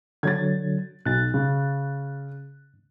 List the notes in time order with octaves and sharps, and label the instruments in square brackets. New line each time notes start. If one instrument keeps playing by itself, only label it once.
[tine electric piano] D3 F#3 [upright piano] G#6 A6
[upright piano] B1 [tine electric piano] F#6 A6
[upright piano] C#3